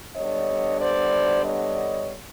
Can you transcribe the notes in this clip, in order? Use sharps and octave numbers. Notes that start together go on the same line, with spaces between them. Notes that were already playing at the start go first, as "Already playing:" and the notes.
D3 G3 B3 D4 C#5 D#5
C5 D5
C#5 D#5